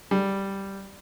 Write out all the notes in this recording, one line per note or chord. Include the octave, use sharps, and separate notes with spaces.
G3